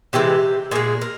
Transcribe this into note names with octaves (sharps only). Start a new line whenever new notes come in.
C3 E3 G#3 G4
A#2 G#3 G#4
A#4